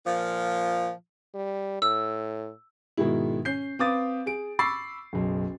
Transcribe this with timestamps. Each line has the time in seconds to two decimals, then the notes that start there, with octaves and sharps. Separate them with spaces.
0.07 A#2 F3
1.35 G3
1.82 A2 E6
2.97 G#2 B2 D#3 G#3 E4
3.45 C#4 G6 C7
3.79 C4 B4 F5 D6 D#6 A6
4.26 G#4 D7
4.59 B5 C#6 D6 E6 A6 C7
5.13 F#1 B1